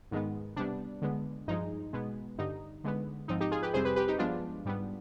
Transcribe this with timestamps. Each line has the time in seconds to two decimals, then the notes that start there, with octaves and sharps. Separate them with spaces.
0.11 G#2 D#3 G#3 B3
0.56 C3 G3 B3 D4
1.02 D3 G#3 B3
1.47 G2 F3 G#3 D#4
1.93 B2 G#3 B3
2.38 G2 D3 G3 D#4
2.84 D3 G#3 B3
3.28 G#2 F3 C4 D#4
3.40 D#4 G4
3.51 F4 G#4
3.62 G4 B4
3.73 F2 C3 G3 C4 G#4 C5
3.85 G4 B4
3.96 G4 B4
4.08 D#4 G4
4.19 G2 F3 G#3 B3 D4 F4
4.65 G#2 G3 B3